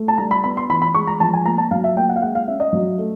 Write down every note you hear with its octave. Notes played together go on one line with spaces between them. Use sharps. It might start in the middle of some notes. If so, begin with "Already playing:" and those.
Already playing: A3
A5
G3 A#5
B5
B3 B5
C6
E3 B5
B5
G#3 C#6
A#5
F3 A5
G#5
A#3 A#5
A5
F#3 F5
E5
A#3 G5
F#5
F5
G#3 F#5
F5
C#4 E5
D#5
F#3
A3